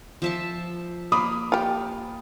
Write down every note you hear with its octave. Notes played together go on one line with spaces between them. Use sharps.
F3 E5 A5
A#3 B5 D6 D#6
F4 G4